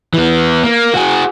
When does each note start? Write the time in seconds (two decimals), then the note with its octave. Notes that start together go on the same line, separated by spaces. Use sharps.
0.14 E3 B3
0.63 A#3
0.94 F#4 G#4